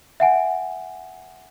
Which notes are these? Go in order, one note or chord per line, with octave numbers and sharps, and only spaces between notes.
E5 F#5 G#5